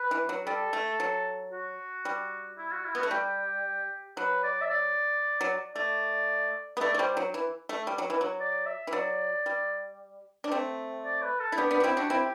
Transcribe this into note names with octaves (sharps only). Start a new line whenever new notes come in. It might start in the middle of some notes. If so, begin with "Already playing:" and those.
Already playing: B4
E3
F#3
G3 A4
A3
F#3
F#4
G3
E4
F#4
E4
B3 F#4
A3
G3 G4
F#3 B4
D5
E5
D5
F#3
A3 D5
B3
A3 D5
A3
G3 C5
F#3
E3
A3
G3
F#3
E3
F#3
D5
E5
E3
F#3 D5
G3
D4
A3 C4
D5
B4
A4
E4
B3 D4 G4
B3 D4
F#4
C4 E4
D4 F#4
C4 E4